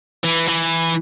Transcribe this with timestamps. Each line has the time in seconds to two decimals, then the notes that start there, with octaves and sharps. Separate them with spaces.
0.24 E3
0.48 E3